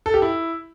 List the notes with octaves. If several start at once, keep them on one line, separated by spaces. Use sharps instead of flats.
A4
G4
E4